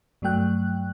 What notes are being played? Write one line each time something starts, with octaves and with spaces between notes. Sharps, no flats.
G2 F#3 A3 G5 F#6